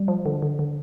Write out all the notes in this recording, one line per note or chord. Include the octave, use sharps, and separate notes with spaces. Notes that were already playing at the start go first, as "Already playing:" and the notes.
Already playing: G3
F3
D3
D3
D3